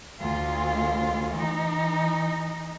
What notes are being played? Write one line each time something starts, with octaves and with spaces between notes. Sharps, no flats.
D2 F4
E3 D#4